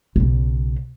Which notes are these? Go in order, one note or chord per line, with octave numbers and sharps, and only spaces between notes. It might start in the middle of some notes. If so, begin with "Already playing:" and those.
B1 C#3